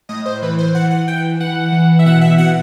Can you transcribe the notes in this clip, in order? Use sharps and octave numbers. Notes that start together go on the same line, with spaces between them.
A2 D#5
C5
E3 B4
C5
E3 F#5
F#5
E3 G5
E3 F#5
E3
E5
B2 F#5
E5
B2 F#5